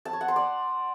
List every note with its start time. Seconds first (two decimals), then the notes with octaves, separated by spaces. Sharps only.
0.05 A5
0.13 C#5
0.21 F#5
0.28 C6
0.36 D5